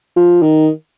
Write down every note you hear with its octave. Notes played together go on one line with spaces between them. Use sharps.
F3
D#3